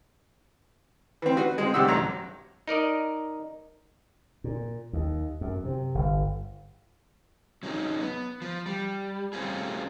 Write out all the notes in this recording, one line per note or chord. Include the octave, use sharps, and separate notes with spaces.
E3 C4
F#4 B4
G#3 C4
G2 C3 G4 D5 F#5 E6
A1 F#3 A#5
D#4 A#4 D5 D#5
A#2
D#2
F#2
C3
G1
F#3 C4 C#4 D#4 G#4
B3
F3
G3
G3 A3 C4 C#4 F4 G#4